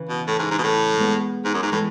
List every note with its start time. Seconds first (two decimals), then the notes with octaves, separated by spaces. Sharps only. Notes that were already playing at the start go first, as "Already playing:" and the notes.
Already playing: C#3 E3
0.09 B2
0.28 A2
0.39 G#2
0.51 G#2
0.59 B2
0.64 A2
0.93 A3
0.99 G#3 B3
1.45 G#2
1.54 F#2
1.63 G#2
1.72 A2 E3 G#3